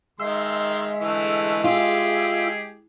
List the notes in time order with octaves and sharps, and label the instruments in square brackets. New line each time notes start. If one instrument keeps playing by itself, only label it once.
[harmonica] D#3 C6 [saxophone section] G#3 [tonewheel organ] E5
[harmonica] D3 E3 A3
[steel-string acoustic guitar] F4 [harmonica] G4 G#4